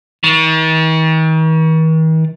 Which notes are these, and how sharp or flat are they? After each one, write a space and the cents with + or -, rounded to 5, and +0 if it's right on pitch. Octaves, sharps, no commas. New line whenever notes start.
D#3 +45